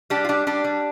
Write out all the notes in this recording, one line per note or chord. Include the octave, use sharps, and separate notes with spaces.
G3 D4 G4
F4
G3 D4 G4
G3 D4 G4
G3